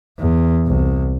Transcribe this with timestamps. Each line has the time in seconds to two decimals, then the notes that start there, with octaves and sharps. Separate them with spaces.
0.19 E2
0.66 C2